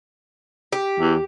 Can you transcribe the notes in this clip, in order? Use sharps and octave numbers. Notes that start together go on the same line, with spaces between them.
G4
E2